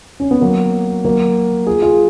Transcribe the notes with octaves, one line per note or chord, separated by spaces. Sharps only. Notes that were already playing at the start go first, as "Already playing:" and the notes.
C#4
B3
F#3 A#3
F#3 A#3
F4 G#4
F4 G#4